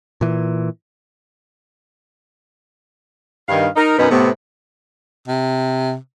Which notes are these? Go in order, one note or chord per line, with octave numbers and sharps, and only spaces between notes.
A#2 E3
G2 D#3 F5
D#4 A#4
F#2 B2 B3 D#4 A#4 B4
A2 C3 B3
C3